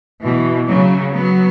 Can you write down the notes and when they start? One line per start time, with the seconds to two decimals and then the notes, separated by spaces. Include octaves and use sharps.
0.25 B2 E3
0.70 C#3 F#3
1.15 F#3 B3